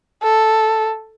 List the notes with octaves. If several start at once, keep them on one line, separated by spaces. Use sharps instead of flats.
A4